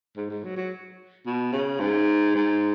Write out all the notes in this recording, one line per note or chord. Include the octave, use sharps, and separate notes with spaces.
G#2
G#2
F#3
F#3
B2
C#3
G#2
G#2